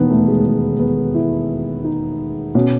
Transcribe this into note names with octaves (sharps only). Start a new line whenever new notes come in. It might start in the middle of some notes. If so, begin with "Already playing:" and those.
Already playing: E1 D#2 D#3 B3
A3
G#3
G#3
B3
E4
D#4
B2 C#4